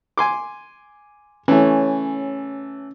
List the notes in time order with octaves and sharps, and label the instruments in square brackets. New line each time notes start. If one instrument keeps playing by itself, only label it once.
[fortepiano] G#5 C6 D6
[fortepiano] E3 A3 [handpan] C#4